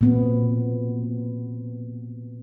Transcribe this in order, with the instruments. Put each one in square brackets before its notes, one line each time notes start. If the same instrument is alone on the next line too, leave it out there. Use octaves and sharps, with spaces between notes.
[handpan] A#2 B3 C4